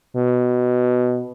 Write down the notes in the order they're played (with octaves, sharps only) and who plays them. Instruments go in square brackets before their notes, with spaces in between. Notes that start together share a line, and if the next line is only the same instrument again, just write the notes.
[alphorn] B2